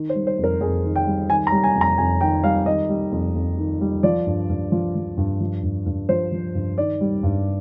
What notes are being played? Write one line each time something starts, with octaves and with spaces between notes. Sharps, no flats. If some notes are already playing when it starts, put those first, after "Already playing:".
Already playing: D#3
C5
G3
C5
F2
A#4
F2 G#4
D#3
G5
G3
D#3 G#5
A#5
G3
G#5
F2
A#5
F2 G#5
D#3 G5
G3 F5
D#3 D#5
G3
F2
F2
D#3
G3
F3 D5
G2
G2
F3
F3
G2
F3
G2
G2
F3 C5
F3
G2
D#3 D5
G3
G2